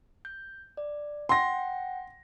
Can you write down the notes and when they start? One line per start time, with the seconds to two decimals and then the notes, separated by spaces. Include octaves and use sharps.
0.25 G6
0.77 D5
1.29 F#5 G5 C6 A#6